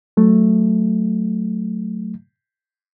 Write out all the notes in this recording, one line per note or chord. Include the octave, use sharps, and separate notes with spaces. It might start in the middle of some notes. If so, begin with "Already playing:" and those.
F#3 A3